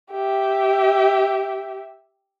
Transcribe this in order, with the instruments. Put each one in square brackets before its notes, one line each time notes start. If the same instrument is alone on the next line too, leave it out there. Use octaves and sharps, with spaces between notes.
[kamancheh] G4 E5